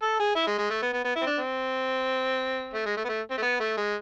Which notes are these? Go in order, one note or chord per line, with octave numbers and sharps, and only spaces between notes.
A4
G#4
E4
G#3
G#3
A3
B3
B3
B3
E4
C4
D4
C4
A3
G#3
A3
B3
A3
C4
A3
B3
A3
G#3